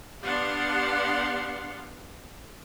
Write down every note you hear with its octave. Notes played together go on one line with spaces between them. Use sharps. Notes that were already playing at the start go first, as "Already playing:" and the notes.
B3 D4 G4 F5 F#5 C6